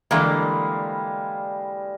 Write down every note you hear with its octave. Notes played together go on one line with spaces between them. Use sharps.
D3 E3 G3 G#3 A#3 F5